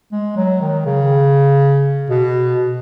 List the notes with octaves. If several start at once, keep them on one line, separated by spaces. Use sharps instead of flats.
G#3
F#3
D#3
C#3
B2